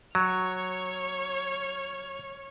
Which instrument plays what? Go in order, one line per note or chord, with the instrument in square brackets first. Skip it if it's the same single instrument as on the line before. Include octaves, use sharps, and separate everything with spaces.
[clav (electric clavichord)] F#3 [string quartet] C#5 C#6 F6